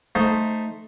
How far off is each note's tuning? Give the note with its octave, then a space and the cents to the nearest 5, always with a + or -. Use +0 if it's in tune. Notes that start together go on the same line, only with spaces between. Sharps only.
A3 +0 D#4 +0 C5 +0